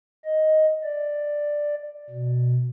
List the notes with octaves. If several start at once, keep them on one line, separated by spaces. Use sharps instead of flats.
D#5
D5
B2